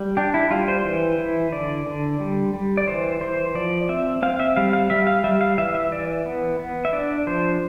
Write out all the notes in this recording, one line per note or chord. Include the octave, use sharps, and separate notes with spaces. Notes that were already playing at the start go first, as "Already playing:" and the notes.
Already playing: G3
D4 G4
E4
G3 F4
C5
E3
E4
D3 D5
D3
G3
G3
D5
E3 C5
E3 C5
F3 D5
C4 E5
C4 F5
E5
G3 F5
F5
G3 E5
F5
G3 E5
F5
E3 E5
E5
E3 D5
B3
B3
E5
D4 D5
F3 C5